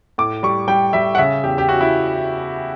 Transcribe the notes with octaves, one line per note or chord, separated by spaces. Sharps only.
A2 D6
G3 C#6
G3 G5
G3 E5
F#5
C#3 E5
E2 G4
G4
C#3 F#4
E4